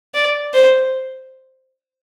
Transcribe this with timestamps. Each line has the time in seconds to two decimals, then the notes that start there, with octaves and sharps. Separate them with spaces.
0.14 D5
0.54 C5